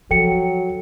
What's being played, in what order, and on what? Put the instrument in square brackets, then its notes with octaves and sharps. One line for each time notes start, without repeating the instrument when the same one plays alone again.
[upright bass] F3 [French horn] F#3 [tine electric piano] A4 [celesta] G5 C#7